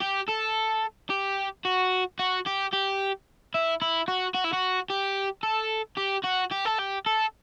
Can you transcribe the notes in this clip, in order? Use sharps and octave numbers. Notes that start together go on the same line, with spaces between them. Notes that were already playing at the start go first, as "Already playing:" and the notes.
G4
A4
G4
F#4
F#4
G4
G4
E4
E4
F#4
F#4
E4
F#4
G4
A4
G4
F#4
G4
A4
G4
A4